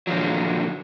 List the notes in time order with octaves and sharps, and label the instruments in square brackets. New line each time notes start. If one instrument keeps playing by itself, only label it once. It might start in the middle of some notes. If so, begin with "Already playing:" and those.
[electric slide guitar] A#2 D3 D#3 F3 F#3